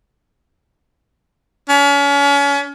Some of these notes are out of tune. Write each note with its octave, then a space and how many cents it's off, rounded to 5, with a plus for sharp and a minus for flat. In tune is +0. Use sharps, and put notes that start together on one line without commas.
C#4 +35